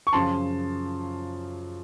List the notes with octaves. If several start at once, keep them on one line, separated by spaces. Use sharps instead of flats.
C#6
F#2 C#3 F3 A5 C6